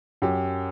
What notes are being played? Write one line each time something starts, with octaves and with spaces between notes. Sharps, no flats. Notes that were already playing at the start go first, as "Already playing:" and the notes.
F#2 G4